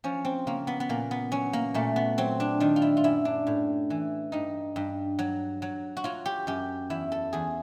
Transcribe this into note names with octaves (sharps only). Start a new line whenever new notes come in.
F3 C#4
C4
C#3 A#3
B3
B3
A#2 A#3
B3
F#3 C#4
A#3
A#2 A3
B3
F#3 C4
D4
D#3 D4
F4
E4
F4
F#2 E4
D4
A2
E3
G2 D#4
G2
F#3
F#3
F#4
F#3 F4
G4
F#2 G4
E2 E4
A4
E2 G#4